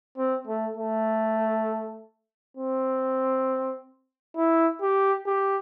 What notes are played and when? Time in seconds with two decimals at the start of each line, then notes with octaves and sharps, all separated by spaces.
0.18 C4
0.47 A3
0.77 A3
2.57 C4
4.36 E4
4.82 G4
5.27 G4